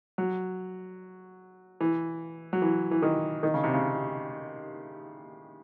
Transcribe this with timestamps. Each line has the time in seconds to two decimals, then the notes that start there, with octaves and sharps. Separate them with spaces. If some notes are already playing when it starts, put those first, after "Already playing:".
0.18 F#3
1.81 E3
2.53 F#3
2.62 E3
2.91 E3
3.02 D#3
3.43 D#3
3.54 C#3
3.64 C3
3.74 C#3